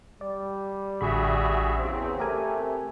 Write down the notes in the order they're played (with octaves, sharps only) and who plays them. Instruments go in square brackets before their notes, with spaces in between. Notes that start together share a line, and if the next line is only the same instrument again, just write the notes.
[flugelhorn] G3 [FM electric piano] D5
[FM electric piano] A1 D3 B5 [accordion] F#4 G#4 E5
[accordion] E2 C#3 C4
[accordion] C3 [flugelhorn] A3 [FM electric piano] G4 A#4 G#5